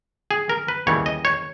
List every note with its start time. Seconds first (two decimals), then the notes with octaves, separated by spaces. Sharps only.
0.31 G#4
0.49 A#4
0.68 B4
0.87 D#2 C#3 E3 G3 C#5
1.06 D#5
1.25 C#5